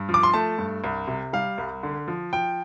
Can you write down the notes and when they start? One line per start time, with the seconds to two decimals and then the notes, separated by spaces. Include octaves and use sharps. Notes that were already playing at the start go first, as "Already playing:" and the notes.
Already playing: G2
0.09 F3
0.14 D6
0.23 C6
0.33 A3 A5
0.59 G2
0.84 C2
1.08 C3
1.33 G3 F5
1.58 C2
1.83 D3
2.08 F3
2.33 F3 G5